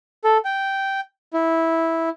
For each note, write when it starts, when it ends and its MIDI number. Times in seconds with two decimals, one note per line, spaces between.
0.24 0.38 69
0.45 1.00 79
1.33 2.09 64